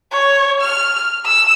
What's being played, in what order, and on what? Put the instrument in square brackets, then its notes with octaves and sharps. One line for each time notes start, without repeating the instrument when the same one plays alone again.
[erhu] C#5
F6
E6